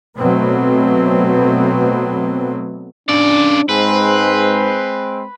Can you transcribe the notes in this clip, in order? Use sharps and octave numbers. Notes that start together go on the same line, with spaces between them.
B2 F#3 A3 B3 C4
C#3 D4 D5
G#2 G#3 C4 B4